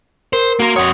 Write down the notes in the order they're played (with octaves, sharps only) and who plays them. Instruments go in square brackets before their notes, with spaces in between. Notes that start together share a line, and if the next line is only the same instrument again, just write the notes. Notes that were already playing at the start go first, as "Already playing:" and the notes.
[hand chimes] A#4 [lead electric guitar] C5
[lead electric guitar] A#3 A#4 [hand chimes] F#4 C6
[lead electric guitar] F2 C#5 [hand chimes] F#5 D#6